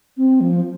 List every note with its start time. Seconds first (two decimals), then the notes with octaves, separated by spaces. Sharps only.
0.17 C4
0.41 F3